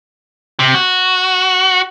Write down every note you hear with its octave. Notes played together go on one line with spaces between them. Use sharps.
C3
F#4